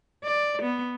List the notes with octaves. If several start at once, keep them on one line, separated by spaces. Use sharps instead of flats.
D5
B3